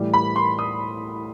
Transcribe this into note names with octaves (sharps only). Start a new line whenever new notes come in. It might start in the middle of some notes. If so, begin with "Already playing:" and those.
Already playing: A2 E3 G3
B5
C6
D#6